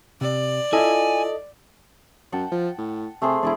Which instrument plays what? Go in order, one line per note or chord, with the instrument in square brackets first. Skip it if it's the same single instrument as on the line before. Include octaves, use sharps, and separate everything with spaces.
[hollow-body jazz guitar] C3 [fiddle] D5
[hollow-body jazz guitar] E4 F4 E5 [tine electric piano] A4 D#5 [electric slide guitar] G#5
[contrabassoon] F#2 [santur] F#5 G5 A5
[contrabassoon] F3
A2
[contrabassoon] C3 [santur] A3 G#4 C5
[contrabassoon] E1 [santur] E4 G#4 D5